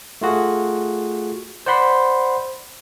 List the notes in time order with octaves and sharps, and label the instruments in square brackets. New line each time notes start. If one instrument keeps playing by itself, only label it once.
[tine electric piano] A3 F4 F#4 G#4
C5 D5 F#5 B5 C6